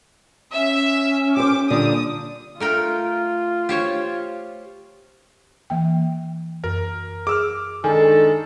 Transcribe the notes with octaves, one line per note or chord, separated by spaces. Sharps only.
C#4 E5
G4 C5 D6
A#2 D3 G3 D#6
A3 F4 A#4 G5
G4 C5 C#5
E3 A#3 G5
F#2 A#4
G#4 D6 E6 F6
D#3 G#3 D4 A4 G#5